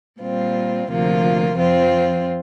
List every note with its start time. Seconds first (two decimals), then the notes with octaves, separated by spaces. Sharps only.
0.20 A#2 G3 C4 F4
0.89 D2 C3 F3 A#3 F4
1.56 F2 F3 C4 F4